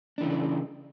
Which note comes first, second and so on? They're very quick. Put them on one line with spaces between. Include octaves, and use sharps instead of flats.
D4 E3 C#3